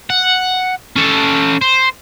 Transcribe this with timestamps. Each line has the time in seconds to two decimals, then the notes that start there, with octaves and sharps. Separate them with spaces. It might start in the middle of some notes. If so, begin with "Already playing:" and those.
0.10 F#5
0.96 C#4 A4
1.62 C5